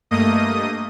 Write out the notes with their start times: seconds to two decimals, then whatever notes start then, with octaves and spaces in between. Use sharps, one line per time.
0.11 G2 A3 A#3 D#5 D#6